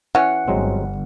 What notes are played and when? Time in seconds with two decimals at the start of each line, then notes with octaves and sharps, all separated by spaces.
0.15 E3 C#4 F#5
0.48 G1 F#3 G#3 C4